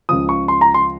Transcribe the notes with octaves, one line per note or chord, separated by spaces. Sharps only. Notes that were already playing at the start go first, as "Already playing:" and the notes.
C#2 C#3 F3 D#6
C#6
C6
A#5
C6